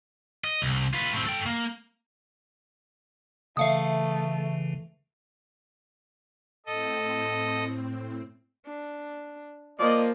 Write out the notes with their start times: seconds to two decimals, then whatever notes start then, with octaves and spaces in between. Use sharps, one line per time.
0.44 D#5
0.62 C2
0.94 F4 B4
1.13 A2 C4
1.27 A4 G5
1.46 A#3
3.57 C#3 E3 A3 E5 F5 D#6
6.66 A2 C4 A4 D#5
8.66 D4
9.79 F3 A#3 D5 D#5